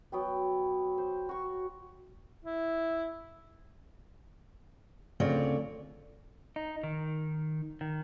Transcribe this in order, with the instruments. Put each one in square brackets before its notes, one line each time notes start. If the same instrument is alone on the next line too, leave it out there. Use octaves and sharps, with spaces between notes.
[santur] F#3 B3 G5
C5
F#4 C#6
[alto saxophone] E4
[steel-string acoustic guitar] D2 C#3 C4 F4 C#5 D5
[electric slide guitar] D#4
D#3
D#3